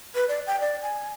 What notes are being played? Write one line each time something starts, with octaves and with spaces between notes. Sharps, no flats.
B4
D5
G5
D5
G#5